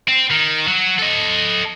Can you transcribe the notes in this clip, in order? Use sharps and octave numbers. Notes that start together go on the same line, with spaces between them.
C4
D#3
F#3
A4 D#5